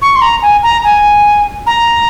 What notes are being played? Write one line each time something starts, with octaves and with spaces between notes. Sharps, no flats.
C#6
C6
A#5
G#5
A#5
G#5
A#5